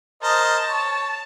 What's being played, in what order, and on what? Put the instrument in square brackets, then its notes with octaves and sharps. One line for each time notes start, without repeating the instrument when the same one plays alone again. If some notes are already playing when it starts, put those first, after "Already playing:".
[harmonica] A#4 C5 D#5 [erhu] A5
[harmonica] C#5